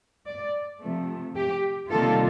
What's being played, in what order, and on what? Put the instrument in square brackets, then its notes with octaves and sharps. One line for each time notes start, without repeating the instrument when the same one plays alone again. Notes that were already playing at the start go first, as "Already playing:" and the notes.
[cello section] D5
C3 F3 A3
G4
C3 D#3 G3 A#3 F4 A4